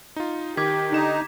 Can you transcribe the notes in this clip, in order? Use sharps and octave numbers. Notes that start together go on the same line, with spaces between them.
D#4 F4
D#3 G4 D6 G#6 B6
D3 D#4 E7